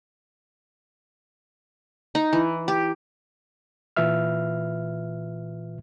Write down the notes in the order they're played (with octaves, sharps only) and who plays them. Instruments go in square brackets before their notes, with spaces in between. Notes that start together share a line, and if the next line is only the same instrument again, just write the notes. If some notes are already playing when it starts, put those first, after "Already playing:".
[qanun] D#4
E3
G4
[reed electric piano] A#2 E3 F4 B4 E5 F6